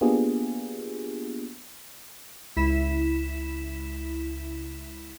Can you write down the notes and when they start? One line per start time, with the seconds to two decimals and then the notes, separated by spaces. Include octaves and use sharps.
0.01 A#3 B3 D4 F4 G4 G#4
2.56 C#2 E4 B6 E7